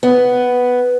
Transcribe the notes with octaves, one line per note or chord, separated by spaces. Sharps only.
B3